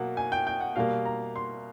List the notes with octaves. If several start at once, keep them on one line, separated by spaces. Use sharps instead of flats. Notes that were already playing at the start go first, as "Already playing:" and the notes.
Already playing: B2 F#3 A#3 F#5
G#5
G5
G5
F#5
B2 G3 A#3 F5
A#5
C6